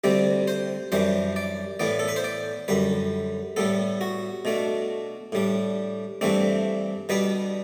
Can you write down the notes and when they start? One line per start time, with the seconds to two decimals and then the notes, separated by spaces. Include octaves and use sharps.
0.04 D2 C3 G3 C4 D5
0.48 C5
0.92 F#2 E3 G3 D4 C5
1.36 D5
1.80 A2 E3 B3 D5
1.99 A4
2.08 B4
2.16 C5
2.24 D5
2.68 F#2 D3 G3 B4
3.56 A2 G3 B3 A4
4.01 F#4
4.45 B2 A3 D4
5.32 A2 G3 D4
6.21 G2 E3 A3 C4 D4
7.09 B2 G3 B3 D4 B4